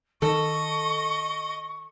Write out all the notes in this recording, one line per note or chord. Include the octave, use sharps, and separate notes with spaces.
D#3 A4 D#5 C#6